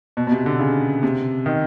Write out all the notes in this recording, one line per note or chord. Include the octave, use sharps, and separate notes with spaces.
B2
B2
C3
D3
C#3
C3
D#3